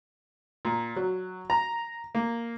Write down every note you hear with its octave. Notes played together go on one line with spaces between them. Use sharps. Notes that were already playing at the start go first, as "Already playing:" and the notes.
A#2
F#3
A#5
A#3